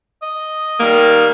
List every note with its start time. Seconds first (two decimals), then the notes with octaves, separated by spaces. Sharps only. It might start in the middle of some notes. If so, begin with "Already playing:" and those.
0.23 D#5
0.80 D#3 G3 A#3